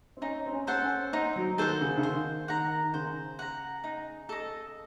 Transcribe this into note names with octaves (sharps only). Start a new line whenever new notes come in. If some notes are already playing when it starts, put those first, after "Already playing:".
C4
C#4 D#4
C4
C#4
A4 C5 F#5
C#4
C4 D#4
F#3
D#3 A4 C5 F#5
C#3
C#3
D#3 C5
D#3 F#5 A#5
D#3
C#3 C5
F#5 A#5
D#4
A4 D#5